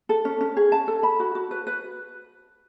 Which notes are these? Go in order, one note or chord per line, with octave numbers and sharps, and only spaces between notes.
A4
C#4
C#4
G#4
A5
A4
B5
F#4
F#4
B4
B4